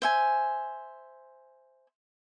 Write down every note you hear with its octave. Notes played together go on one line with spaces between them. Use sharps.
C5 E5 G#5